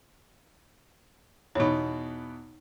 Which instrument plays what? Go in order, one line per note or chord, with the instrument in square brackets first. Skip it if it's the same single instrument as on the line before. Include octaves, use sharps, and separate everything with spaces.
[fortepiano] E2 B2 [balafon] D#4 C#5